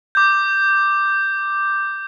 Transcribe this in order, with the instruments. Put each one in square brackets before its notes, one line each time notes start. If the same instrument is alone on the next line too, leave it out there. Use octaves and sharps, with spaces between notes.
[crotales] D6 G6